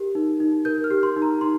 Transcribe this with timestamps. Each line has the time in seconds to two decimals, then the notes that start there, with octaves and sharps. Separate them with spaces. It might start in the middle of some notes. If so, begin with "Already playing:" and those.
Already playing: G4 A#4
0.15 D#4
0.40 D#4
0.65 A#4 G6
0.84 F6
0.90 G4
1.03 C6
1.16 D#4
1.22 A#5
1.41 D#4 C6